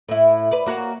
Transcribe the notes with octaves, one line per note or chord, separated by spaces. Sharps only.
A2 E4
B4 D5
A#3 F#4 C#5